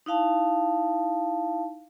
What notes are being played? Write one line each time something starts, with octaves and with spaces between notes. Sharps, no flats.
D#4 E4 F5 A5